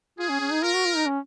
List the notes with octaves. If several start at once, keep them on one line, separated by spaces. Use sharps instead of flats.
F4 G#4
C#4
C#4
D#4
F4 A#4
F#4
F4
D#4
C#4